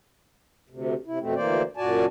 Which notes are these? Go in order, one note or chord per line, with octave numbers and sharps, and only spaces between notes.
D2 C3
C3 E4
F2 B2 A3 C4
D2 E3 A#3 C5 D5
F#2 A#2 F#4 D5 G#5 A5